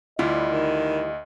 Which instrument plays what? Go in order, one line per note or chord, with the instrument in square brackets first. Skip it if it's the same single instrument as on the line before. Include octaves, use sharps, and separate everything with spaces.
[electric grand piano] D2 [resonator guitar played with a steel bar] G3 E4 F4 [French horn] D#5
[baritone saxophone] D#3